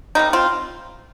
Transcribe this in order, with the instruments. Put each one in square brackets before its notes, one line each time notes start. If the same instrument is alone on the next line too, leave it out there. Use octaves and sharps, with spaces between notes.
[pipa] C3 G3 A#3 D#4
C4 F4